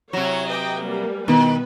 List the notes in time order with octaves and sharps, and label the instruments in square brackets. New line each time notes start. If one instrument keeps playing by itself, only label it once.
[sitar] C3 F#3 [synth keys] E4 A#6 E7 [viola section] C#5
[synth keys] B4 G#5 D6 [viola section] D#5 G5
[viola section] G3 A#3
[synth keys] B2 B3 E4 [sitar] D#3 [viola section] B4